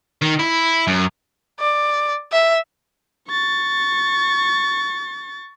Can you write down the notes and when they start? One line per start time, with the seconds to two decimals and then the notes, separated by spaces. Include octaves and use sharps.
0.22 D#3
0.39 E4
0.87 F#2
1.60 D5
2.32 E5
3.29 C#6 A6